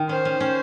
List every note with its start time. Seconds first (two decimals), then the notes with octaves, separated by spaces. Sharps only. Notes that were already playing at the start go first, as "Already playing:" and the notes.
Already playing: D#3
0.09 C#4 C5
0.25 C#4
0.40 C#4